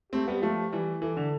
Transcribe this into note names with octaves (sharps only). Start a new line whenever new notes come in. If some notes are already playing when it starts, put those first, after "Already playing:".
A3 C4 G4
G3 B3
F3 A3
E3 G3
E3 A4
D3